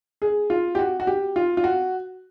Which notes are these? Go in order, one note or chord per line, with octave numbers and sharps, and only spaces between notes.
G#4
F4
G4
F#4
F#4
G4
F4
F4
F#4